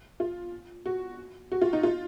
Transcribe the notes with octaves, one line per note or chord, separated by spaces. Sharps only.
F4
F#4
F#4
F4
D#4
F4